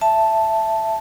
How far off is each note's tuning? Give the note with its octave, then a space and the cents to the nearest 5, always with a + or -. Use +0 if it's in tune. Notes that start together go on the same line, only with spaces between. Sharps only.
E5 +10 A5 +0